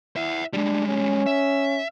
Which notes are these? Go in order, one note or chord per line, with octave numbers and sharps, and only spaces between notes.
E4 E5 F#5
G3 G#3 D4
C#4
E5